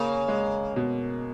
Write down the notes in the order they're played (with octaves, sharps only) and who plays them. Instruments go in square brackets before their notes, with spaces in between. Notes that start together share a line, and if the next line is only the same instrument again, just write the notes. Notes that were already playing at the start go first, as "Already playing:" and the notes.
Already playing: [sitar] C#3 [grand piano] A#3
[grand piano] G#3
B2